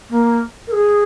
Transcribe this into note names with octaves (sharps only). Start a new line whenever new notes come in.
A#3
A#4
G#4